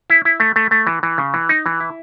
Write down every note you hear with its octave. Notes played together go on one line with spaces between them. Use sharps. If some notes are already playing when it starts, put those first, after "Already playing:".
E4
E4
A3
A3
A3
E3
E3
C#3
E3
D#4
E3
E4